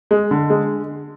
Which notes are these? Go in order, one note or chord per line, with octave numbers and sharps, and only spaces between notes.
G#3
D3
G#3